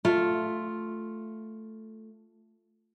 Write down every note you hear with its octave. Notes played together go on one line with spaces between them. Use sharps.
A3 F4